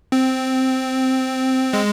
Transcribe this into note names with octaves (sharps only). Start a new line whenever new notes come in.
C4
G#3